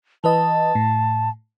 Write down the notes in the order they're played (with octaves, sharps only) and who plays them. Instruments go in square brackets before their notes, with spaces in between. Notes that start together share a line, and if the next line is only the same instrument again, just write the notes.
[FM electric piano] E3 B4 D#5 [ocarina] A5
[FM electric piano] A2